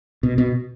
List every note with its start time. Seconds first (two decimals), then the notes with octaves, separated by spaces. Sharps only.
0.23 B2
0.38 B2